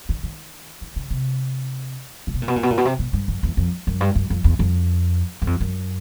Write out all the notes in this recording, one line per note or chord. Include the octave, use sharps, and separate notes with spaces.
D3
D#3
D#3
C#3
C3
A#2
B2
A#2
B2
A#2
B2
A#2
B2
C3
B2
G2
F#2
E2
F2
F#2
G2
F#2
F2
E2
F2
F#2
F2
F#2